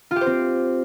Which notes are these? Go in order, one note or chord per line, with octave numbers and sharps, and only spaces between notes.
F4
G4
C5
C4